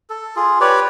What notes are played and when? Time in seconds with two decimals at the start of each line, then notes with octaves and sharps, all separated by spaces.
0.10 A4
0.36 F4 G#4
0.61 G4 B4 C#5 D5